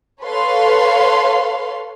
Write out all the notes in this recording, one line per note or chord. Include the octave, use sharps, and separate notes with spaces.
A4 B4 C#5 F5 C6